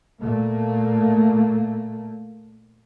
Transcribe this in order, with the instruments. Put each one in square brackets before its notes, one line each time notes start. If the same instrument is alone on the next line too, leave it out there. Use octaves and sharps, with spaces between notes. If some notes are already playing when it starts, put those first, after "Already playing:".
[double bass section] A#2 A3 A#3